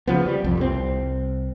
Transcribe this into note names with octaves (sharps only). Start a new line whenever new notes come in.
C#3 F3 B3
G3
C2 F2
C2 C4